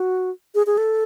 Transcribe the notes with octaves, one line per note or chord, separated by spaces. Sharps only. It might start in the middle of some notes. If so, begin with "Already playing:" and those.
Already playing: F#4
G#4
G#4
A4